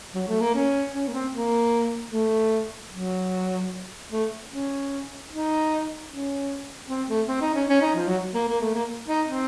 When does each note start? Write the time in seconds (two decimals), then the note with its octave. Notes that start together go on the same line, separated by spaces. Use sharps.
0.15 F#3
0.28 A3
0.41 A#3
0.55 C#4
0.93 C#4
1.08 A#3
1.14 C4
1.33 A#3
2.12 A3
2.91 F#3
4.12 A3
4.50 C#4
5.30 D#4
6.10 C#4
6.89 C4
7.08 A3
7.28 C4
7.41 D#4
7.54 C#4
7.69 C#4
7.82 D#4
7.95 F3
8.08 F#3
8.34 A#3
8.48 A#3
8.61 A3
8.74 A#3
9.08 D#4
9.27 C4